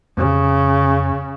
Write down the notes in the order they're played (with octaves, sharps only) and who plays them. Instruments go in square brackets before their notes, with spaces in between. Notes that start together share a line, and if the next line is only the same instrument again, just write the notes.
[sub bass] F2 [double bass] C#3